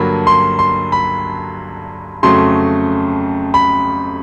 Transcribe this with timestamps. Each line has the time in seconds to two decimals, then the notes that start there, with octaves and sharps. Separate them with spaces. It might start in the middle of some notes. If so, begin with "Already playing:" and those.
Already playing: G2 D3 F#3 A#3 B5
0.27 C6
0.59 C6
0.92 B5
2.23 F2 C#3 F#3 A3 C6
3.54 B5